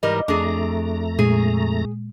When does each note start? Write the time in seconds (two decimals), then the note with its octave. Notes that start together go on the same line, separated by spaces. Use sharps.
0.03 G#2 E3 G3 A#4 D#5
0.28 F2 A3 D4 G#4 A#5
1.19 A#2 G#3 G#4